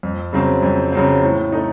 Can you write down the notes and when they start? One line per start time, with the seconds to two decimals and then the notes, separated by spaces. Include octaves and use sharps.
0.03 F2
0.33 C#3 F#3 C4
0.62 F2
0.92 C#3 F#3 C4
1.23 A2
1.52 A3 D#4